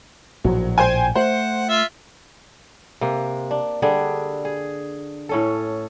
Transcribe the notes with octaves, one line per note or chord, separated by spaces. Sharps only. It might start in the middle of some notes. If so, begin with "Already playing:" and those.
A#1 A2 F3 F#3
C5 G5 G#5
A3 C5 F#5
F4 E5
C3 A#3
D4
D3 G3 D4 G#4
G#4
A2 C#4 A4